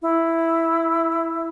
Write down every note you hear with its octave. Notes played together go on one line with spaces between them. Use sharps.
E4